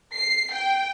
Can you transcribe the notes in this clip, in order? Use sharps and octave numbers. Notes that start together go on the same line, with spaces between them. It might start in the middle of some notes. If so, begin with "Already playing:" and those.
C7
G5